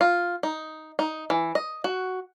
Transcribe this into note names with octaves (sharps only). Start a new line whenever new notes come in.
F4
D#4
D#4
E3
D#5
F#4